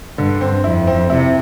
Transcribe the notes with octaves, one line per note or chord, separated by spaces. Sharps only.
G2 D3
C4
F2 E4
C4
C3 E4